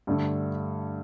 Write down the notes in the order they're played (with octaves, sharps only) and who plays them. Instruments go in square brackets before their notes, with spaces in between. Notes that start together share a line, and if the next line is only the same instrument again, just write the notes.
[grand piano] G2 D3 A3